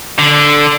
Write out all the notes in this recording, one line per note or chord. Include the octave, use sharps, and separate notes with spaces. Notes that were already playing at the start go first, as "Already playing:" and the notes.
D3